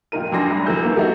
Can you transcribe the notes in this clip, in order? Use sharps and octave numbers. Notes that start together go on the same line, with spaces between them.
F1 D#2 A#2 D#4 A#4 D#7
A1 F#2 D4 G#5 C6 A#6
C2 B5
F#2 D#3 E3 A3 E6 G6
E3 A#3 B3
E3 D#4 E4 F#4 G4 A4